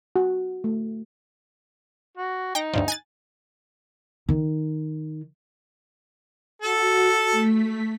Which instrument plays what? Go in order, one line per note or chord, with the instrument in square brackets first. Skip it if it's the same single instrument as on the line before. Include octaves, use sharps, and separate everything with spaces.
[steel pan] F#4
A3
[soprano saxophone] F#4
[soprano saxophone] D#4 [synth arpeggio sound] G5 A#6
[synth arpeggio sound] D2 G2 F3
G#5 F#6 A6
[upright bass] D#3 D#4
[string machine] F#4 [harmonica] A4
[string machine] A3 B6